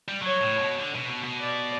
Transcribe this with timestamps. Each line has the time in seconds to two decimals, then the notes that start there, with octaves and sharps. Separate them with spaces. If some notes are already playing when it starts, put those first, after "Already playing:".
0.08 G3
0.22 F#3 C#5
0.42 A2
0.60 B2
0.81 D3
0.95 B2
1.10 B2
1.24 B2
1.38 D5